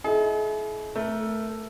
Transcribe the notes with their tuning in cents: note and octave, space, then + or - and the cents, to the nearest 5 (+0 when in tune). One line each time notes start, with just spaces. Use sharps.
E4 +0 G#4 +45 D#5 +5
A3 +0 A#4 +20